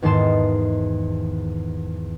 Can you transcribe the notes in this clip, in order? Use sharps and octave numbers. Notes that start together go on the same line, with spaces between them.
E2 G#2 D#3 A5 C6 E7